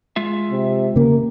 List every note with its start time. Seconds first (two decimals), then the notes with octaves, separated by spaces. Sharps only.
0.16 G#3 F4 E5
0.51 C3
0.96 C#3 A#3 A#4